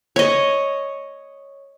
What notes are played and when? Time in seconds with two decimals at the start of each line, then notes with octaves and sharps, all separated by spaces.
0.16 C#5 D#5